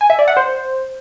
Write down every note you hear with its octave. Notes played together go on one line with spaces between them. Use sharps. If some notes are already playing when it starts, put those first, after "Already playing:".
G#5
E5
D5
F#5
C5